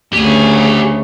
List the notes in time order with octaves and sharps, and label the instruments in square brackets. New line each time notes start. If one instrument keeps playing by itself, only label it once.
[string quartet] D2 C#3 [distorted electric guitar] G4 G#5